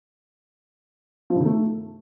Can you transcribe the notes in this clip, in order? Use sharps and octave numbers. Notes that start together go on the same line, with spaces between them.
F3
G2
D#3
A3